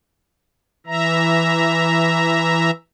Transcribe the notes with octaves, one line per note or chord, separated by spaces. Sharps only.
E3 E5 A#5